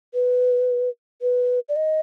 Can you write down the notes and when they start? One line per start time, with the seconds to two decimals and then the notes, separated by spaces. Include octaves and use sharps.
0.14 B4
1.22 B4
1.69 D5
1.76 D#5